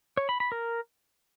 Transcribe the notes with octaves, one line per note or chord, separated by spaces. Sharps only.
C#5
B5
B5
A#4